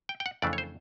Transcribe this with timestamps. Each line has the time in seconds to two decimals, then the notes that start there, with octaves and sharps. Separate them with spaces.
0.09 G5
0.20 G5
0.26 F#5
0.42 F2 C#3 E3 A3 D4 D5
0.53 C#5
0.58 C5